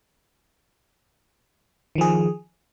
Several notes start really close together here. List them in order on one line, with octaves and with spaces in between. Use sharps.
D#3 F3 G#4